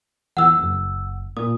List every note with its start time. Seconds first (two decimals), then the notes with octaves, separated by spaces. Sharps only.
0.37 E2 F#5 E6
0.59 F#1
1.37 A#2 D#6